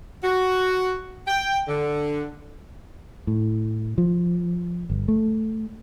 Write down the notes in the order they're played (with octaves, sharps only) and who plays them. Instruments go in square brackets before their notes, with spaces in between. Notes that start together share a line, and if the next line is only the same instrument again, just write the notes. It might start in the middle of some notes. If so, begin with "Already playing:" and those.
[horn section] F#4
G5
D3
[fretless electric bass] A2
F3
G1
A3